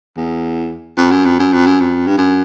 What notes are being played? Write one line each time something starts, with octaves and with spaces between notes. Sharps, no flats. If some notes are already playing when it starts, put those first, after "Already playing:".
E2
F2
F#2
F2
F#2
F2
F#2
F2
G2
F#2